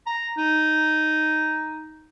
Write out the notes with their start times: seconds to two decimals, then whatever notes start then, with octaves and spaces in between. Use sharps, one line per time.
0.07 A#5
0.38 D#4